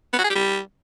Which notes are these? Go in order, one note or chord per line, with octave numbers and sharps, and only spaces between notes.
B3
F#4
G#4
G4
G3